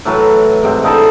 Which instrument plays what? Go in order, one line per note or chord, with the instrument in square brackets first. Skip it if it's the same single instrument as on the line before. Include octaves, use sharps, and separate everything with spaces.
[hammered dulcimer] A2 E3 F#3 B4
G#2 C3 C4
D3 D#4 E4 A4